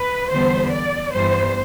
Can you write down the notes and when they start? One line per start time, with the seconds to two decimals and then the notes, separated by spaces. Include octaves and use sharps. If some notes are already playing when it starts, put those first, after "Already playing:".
Already playing: B4
0.31 E2 D3 G3 B3 C5
0.73 D5
1.14 G2 E3 G3 B3 C5